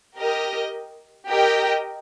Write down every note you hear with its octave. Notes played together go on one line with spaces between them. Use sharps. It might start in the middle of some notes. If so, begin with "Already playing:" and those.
G4 A#4 D#5
G4 A#4 D#5 G5